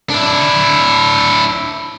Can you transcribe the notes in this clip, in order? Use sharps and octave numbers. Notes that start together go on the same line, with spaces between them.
D4 E4